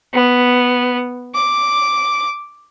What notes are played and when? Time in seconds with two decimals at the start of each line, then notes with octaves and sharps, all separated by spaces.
0.14 B3
1.34 D6